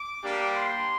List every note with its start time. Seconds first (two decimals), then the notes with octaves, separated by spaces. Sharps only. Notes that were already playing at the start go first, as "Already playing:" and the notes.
Already playing: D6
0.22 G3 A#3 D4 G4
0.56 C6